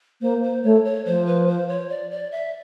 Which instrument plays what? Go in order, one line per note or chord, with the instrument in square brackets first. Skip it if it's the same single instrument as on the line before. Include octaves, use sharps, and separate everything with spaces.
[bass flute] A#3 [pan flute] C5
[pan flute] C5
[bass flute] A3 [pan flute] C#5
[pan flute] C#5
[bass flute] F3 [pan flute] C5
[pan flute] B4
C5
C#5
D5
D5
E5